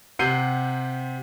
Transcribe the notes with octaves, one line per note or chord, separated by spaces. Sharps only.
C3 F#5 G6 C7 D#7